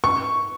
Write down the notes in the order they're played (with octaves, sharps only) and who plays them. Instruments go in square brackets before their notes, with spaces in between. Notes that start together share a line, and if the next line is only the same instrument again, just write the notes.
[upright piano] C#6